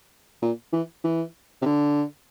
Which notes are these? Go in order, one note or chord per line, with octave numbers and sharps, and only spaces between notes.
A#2
E3
E3
C3
D3